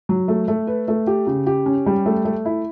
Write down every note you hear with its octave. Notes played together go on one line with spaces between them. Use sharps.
F#3
A3
A3
B4
A3
G4
C#3
G4
C#4
G3
A3
A3
E4